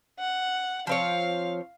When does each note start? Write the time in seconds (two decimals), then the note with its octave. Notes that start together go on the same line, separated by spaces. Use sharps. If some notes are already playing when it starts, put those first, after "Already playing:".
0.19 F#5
0.87 F3 C4 C#5 F5